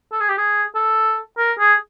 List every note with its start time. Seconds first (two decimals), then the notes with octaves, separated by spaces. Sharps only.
0.12 A4
0.21 G#4
0.29 G4
0.38 G#4
0.75 A4
1.38 A#4
1.59 G#4